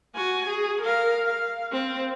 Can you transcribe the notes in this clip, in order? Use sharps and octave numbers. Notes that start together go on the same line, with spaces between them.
F#4 G#5
G#4
A#4 F5
F5
C4